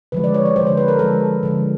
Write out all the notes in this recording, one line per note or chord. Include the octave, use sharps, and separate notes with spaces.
D3 F3 G#3 B4
D5
C#5
D5
D3 F3 G#3 C5
C5
B4
A#4
D3 F3 G#3 A4
D3 F3 G#3